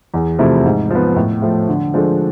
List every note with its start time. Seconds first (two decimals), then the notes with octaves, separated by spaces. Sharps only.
0.14 E2
0.39 C3 F3 A3 E4
0.65 G#2
0.91 F3 B3
1.16 A2
1.42 F3 A3
1.69 D3
1.94 F3 G#3 D4 A4